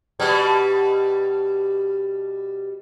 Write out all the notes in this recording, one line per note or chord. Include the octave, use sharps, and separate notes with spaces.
B2 G3